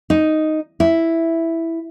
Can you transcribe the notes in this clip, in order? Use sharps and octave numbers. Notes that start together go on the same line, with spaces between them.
D#4
E4